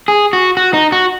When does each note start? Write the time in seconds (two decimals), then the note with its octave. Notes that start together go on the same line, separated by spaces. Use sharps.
0.08 G#4
0.33 F#4
0.57 F#4
0.74 D#4
0.92 F#4